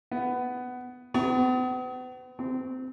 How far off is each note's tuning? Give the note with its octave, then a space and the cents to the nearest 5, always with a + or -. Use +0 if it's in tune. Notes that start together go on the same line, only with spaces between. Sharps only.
B3 +15
B3 +45
C4 -20